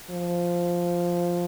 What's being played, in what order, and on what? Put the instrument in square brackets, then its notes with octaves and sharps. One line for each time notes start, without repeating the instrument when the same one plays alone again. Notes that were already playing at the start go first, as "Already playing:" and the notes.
[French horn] F3